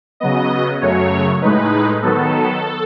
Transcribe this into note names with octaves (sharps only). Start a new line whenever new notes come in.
C#3 F#3 B3 D#5
F#2 C#3 F#3 A3 C#5
A2 G#3 D#4 B4
D#3 F#3 B3 A4